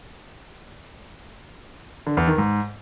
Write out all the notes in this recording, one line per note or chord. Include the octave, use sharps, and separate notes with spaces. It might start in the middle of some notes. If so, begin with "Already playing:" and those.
D3
E2
D#3
G#2